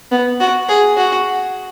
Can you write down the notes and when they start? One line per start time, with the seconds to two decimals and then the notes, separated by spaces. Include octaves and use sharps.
0.11 B3
0.40 F#4
0.69 G#4
0.97 F#4